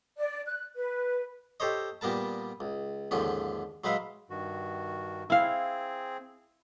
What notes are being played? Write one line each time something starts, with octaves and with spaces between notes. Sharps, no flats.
D5
F#6
B4
G4 A4 C5 C#5 D#5
A#2 G3 B3 A#4 A5
C#2
D#2 G#2 D3 F3 C#4
F#3 G#3 B4 E5 F5
G2 D#3 F#4
C4 E4 G#4 F5